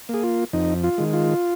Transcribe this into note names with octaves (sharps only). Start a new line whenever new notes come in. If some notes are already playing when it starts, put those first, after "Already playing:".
A#3 G#4
F4
F2 D#4
F4
D#3 G#3
F4